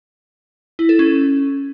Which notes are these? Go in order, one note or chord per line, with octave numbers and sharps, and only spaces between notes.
E4
A4
C#4